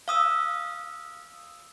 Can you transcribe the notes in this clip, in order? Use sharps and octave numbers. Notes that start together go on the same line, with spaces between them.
F5 D#6 E6